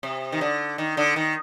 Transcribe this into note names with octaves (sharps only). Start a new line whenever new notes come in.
C3
D#3
D3
D#3
D3
D#3